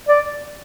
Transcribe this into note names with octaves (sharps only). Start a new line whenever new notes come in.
D5